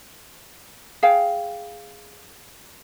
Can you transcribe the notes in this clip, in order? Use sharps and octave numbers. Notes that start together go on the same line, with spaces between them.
G#4 F5 G5